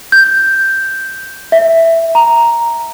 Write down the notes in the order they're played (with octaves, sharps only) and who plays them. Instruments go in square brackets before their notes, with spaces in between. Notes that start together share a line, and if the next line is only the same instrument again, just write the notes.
[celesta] G6
E5
A#5